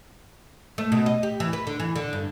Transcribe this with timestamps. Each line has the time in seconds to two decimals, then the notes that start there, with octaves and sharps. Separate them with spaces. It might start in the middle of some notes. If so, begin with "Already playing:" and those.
0.78 A3
0.92 B2
1.06 D#5
1.23 G4
1.40 E3
1.53 B4
1.67 D3
1.80 E3
1.96 D3
2.13 G2